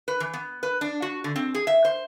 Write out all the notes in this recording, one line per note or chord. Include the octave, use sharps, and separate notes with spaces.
B4
E3
B3
B4
D4
F#4
D3
C4
G#4
E5
C5